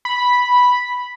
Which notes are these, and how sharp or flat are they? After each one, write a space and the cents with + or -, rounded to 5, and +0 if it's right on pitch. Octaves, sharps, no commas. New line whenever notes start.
B5 -5